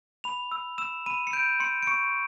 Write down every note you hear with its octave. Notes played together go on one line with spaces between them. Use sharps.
B5 F7
E6
E6 E7
B5 D#7
C#7
G6 D7
C6 C#7
D7
C#6 C#7